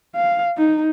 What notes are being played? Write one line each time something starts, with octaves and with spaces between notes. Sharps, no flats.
F5
D#4